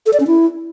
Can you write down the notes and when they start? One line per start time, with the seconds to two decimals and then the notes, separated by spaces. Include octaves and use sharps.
0.06 A4
0.13 D5
0.20 C#4
0.27 E4